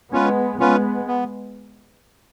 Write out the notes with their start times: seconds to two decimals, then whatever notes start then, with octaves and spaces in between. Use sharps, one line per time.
0.12 G#3 B3 C#4 F4 B4
0.60 G#3 B3 C#4 F4 B4
1.08 B3